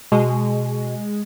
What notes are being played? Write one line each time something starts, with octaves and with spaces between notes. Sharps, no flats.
B2 G#3